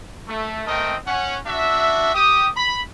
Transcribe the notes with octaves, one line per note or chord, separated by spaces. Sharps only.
A3
A3 C4 A#4 D#5 G5
C#4 F#5
D4 F#4 E5
G4 D#6
B5